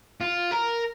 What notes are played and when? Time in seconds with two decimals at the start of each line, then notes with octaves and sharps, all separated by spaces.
0.21 F4
0.51 A#4